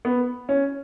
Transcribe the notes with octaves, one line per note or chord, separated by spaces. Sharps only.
B3
C#4